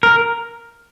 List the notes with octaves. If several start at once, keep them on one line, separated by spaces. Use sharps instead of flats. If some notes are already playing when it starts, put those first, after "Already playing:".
A#4